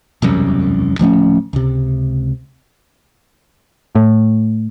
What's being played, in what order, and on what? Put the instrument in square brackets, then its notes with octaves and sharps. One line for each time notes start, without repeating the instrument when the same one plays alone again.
[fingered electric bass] E1 C2 F#2
D1 F3 A3 C#4
C#2 C3
[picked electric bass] A2